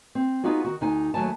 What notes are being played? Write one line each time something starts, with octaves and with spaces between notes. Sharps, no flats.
C4
B3 D#4 F4 F#4 G#4
D#3 F#4
D2 D#4 G#5
D#2 F#3 A3 G#5 A5